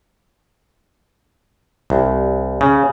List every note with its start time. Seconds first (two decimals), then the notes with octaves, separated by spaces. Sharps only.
1.90 C2
2.61 C#3